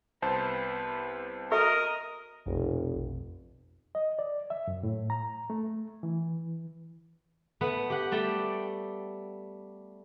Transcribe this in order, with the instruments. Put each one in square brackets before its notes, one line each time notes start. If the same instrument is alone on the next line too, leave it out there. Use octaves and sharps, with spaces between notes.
[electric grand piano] C2 C5 A5 [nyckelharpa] B3 B4
[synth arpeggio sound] F#4 A4 E5 [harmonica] A#4 [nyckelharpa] D#5
[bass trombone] F1 [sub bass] A#1 [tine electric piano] F2 B2
[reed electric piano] D#5
D5
E5
F#2
A2
A#5
A3
E3
[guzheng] A3 B3 B4
G4 F#5
G3 A3 D5 G5